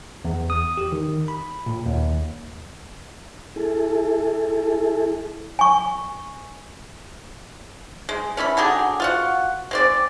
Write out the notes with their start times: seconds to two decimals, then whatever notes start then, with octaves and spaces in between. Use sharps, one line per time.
0.25 E2
0.50 D#6
0.77 G4
0.92 D#3
1.28 B5
1.66 A#2
1.86 D#2
3.56 E4 G#4 A4
5.59 G#5 C#6
8.09 G#3
8.37 C#4 E4 D5 B5
8.57 D3 F#3 G4 G#4
9.00 F4 F#4 F#5
9.71 G#3 C4 D5